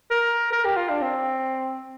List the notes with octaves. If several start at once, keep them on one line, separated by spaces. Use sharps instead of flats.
A#4
A#4
G4
F4
D4
C4